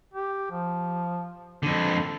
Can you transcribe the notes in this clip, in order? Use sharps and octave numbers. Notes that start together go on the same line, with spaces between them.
G4
F3
F2 D3 A4